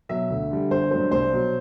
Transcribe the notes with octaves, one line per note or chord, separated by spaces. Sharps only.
B2 F#3 E5
D2
D3 G3
G1 C5
G2 F#3 C5
C2 C5
B2 F#3